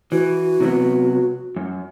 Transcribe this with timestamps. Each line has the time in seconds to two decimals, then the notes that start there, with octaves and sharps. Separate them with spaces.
0.12 E3 F#4
0.60 C3 F#3 B3
1.56 F#2